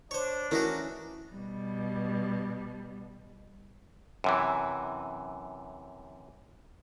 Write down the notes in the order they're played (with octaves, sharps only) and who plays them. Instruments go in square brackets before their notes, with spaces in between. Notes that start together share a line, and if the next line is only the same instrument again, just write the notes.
[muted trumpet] D4 [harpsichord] C5 C#5
[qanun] E3 C#4 [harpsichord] A3 D#4 F#4 [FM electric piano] A#4
[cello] B2 G3
[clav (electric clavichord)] F#2 C3 E3